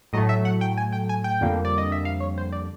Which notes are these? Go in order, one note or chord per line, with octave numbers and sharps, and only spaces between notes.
A2 F#3 A3 D#5
E5
F#5
G5
G#5
G5
G#5
G5
F2 D3 G3 A#3
D5
D#5
E5
F5
C#5
C5
D5